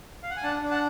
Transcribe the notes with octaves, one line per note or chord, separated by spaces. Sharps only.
F5
F#5
G#5
D4 F#5 A5
D4
F#5 A5